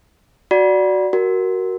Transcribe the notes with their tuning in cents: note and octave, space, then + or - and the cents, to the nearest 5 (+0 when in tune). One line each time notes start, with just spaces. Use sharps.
F#4 +0 D5 -5 B5 -35
F#4 +15 A#4 +5